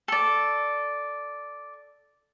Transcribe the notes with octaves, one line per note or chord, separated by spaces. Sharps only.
A4 D5